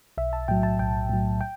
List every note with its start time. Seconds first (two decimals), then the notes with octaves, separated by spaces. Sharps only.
0.18 B1 E5
0.33 A5
0.48 A2 F#3 G5
0.63 A5
0.79 B1 G5
1.09 A2 F#3
1.41 G5